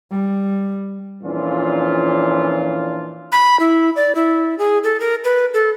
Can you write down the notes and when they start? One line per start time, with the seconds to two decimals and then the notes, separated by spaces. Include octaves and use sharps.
0.11 G3
1.23 F2 A#2 E3 C#4 D4 F4
3.32 B5
3.60 E4
3.96 D5
4.15 E4
4.58 G#4
4.84 A4
5.00 A#4
5.24 B4
5.54 A4